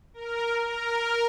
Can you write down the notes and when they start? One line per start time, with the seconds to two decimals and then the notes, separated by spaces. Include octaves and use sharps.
0.14 A#4
0.68 A#4